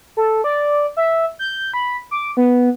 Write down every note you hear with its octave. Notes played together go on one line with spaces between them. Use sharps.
A4
D5
E5
G6
B5
D6
B3